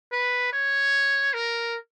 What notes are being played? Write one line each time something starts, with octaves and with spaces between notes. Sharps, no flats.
B4
C#5
A#4